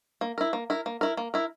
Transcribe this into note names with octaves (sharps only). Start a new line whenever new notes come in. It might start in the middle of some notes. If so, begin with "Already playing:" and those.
A#3
E4 A#4
A#3
E4 A#4
A#3
E4 A#4
A#3
E4 A#4